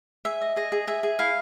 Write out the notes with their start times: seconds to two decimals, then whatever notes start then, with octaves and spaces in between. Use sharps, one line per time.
0.25 G#4 E5
0.41 D#5
0.56 G#4 D#5
0.72 G#4
0.87 G#4 E5
1.03 G#4
1.19 E4 F5